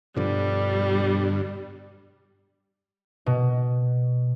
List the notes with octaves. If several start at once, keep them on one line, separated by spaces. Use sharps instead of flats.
G2 B2 D3 F3 G3
B2